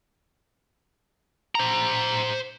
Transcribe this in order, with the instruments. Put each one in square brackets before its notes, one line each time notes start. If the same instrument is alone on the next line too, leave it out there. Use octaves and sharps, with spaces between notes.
[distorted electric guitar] C5 A#5